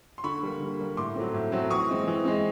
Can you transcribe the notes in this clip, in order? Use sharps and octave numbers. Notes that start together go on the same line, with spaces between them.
C6
D3 B5 C#6
G3 A#3
D3
G3 A#3
A2 C6 D6
F#3 A3 C4
A2
F#3 A3 C4
E3 C#6 D#6
G#3 C4
E3
G#3 C4